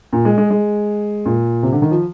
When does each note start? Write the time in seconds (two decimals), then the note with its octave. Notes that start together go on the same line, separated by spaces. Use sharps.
0.13 A#2
0.25 G#3
0.38 G#3
0.50 G#3
1.26 A#2
1.63 C3
1.72 D3
1.82 D#3
1.91 F3